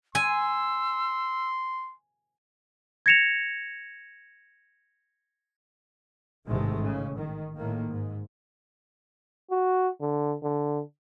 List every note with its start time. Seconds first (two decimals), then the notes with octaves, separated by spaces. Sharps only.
0.15 G#5 C6 E6
3.06 G#6 A#6 C#7 E7 F7
6.46 A1 G#2 C3 D#3 G#3 A3
6.83 C#3
7.17 D#3
7.56 A2 D#3 A#3
7.91 G#2
9.51 F#4
10.01 D3
10.43 D3